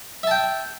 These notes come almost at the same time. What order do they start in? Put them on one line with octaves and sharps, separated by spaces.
E5 A5 G5